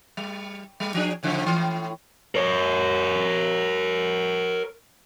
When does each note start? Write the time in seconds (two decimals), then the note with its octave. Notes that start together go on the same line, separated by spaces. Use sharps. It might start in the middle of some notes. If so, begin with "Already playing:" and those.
0.17 G3
0.80 G3
0.94 F3 D4 G#4
1.23 A2 C#3 F3
1.46 A2 E3
2.35 A#4 C#5